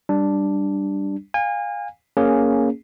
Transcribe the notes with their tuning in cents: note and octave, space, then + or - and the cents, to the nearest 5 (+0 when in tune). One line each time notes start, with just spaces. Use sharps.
G3 +0 D4 +0
F5 +20 G#5 -30
A#3 +0 C#4 +5 G#4 +0